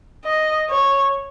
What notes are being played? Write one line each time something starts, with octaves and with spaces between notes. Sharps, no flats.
D#5
C#5